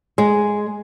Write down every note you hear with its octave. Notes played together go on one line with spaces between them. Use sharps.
G#3